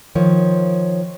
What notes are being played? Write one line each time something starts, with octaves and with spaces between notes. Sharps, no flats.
D#3 F3 C#5